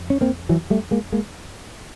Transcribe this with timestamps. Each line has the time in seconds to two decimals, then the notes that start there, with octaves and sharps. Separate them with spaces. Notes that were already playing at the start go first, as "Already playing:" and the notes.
Already playing: F2
0.10 C#4
0.21 A#3 C4
0.49 E3 F#3
0.70 G3 A3
0.91 G#3 A#3
1.12 G#3 A#3